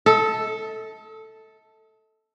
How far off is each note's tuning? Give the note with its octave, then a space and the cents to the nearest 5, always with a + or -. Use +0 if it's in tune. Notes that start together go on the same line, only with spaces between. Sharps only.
A4 +0 D#5 +45